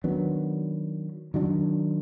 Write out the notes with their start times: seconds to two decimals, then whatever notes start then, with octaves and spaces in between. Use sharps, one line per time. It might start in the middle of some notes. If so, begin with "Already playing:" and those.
0.04 D#3 F#3 B3 D4
1.34 D#3 F#3 D4